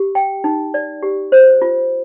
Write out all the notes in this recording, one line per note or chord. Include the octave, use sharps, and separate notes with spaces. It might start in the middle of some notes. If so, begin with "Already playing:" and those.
Already playing: G4
G5
D#4
D5
G4
C5
F4